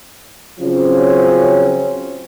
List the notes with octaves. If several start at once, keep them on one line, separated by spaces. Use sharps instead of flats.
C#3 F3 F#3 C4 C#4